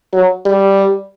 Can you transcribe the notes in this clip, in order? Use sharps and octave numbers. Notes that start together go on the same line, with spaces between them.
F#3
G3